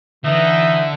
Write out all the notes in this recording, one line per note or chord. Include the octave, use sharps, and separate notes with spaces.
D3 E3 D#4 E5